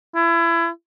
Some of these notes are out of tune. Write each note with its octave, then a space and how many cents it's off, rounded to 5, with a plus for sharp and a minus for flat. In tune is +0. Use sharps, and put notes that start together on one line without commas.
E4 +30